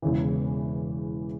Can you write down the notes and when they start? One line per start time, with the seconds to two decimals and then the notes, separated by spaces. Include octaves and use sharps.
0.02 E1 E2 C#3 E3